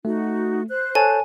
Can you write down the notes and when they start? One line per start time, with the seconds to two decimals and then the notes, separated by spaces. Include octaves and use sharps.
0.05 A3 D#4 F#4
0.69 C5 F#6
0.95 A4 C#5 G#5 A5